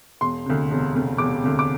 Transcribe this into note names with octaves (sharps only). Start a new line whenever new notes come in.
E1 C6
D2 C3
E1
D2 C3
E1 D6
D2 C3
D6